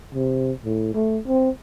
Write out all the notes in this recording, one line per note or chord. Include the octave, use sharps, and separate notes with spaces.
C3
A2
A3
C4